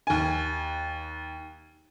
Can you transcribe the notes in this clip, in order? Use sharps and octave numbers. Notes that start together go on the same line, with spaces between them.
D#2 G#5